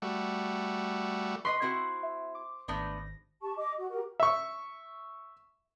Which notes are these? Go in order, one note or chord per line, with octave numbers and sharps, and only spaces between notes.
G3 A3 F#4
B4 D5 D#5 C6 C#6 B6
C4 E4 F#4 C5
E5
D6
G#1 A3 B3 D4 A#6
G4 A5 C#6
D#5 D6
F#4
F#4 G4 A#4
E5 C#6